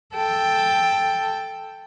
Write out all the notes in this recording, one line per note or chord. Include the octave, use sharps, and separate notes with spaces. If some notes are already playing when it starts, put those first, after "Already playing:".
A4 G5